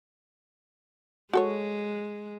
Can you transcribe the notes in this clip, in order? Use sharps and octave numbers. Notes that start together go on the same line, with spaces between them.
G#3 F#4 A4 C#5